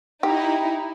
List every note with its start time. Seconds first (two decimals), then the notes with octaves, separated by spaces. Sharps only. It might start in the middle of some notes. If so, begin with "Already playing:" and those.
0.23 D#4 E4 G4